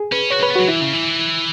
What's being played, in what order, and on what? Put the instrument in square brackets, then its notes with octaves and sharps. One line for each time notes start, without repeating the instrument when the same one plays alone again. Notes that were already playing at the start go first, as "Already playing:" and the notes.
Already playing: [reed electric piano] G#4
[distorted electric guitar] C#4 [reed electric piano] B4
[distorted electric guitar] F#4 [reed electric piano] C#5
[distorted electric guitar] C#4 [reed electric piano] B4
[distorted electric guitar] B3
[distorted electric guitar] F#3 [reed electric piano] F#4
[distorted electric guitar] E3 [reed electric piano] E4
[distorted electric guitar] C#3
E3